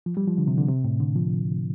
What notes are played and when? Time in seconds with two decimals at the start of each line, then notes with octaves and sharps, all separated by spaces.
0.06 F3
0.17 G3
0.27 F3
0.38 D3
0.48 C3
0.58 D3
0.68 C3
0.84 A2
1.00 D3
1.16 F3